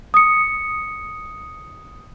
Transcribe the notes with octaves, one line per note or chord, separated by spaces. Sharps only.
D#6 C#7